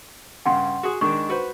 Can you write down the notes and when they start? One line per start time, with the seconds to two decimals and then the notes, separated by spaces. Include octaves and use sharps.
0.46 G2 C#3 F#5 C6
0.83 F#4 G#4
1.01 D#3 G#3 D4 C#6
1.29 F#4 B4 C5